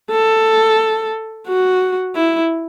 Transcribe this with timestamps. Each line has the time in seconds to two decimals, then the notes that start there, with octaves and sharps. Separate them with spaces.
0.11 A4
1.48 F#4
2.16 E4